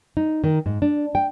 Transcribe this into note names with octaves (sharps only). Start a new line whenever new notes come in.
D#4
D#3
G#2
D4
G5